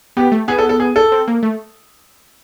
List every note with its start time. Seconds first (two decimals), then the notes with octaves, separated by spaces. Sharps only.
0.17 B3 G4
0.32 A3
0.48 B3 G#4
0.58 A4
0.69 A4
0.80 G#4
0.96 A4
1.12 C4
1.28 A#3
1.43 A3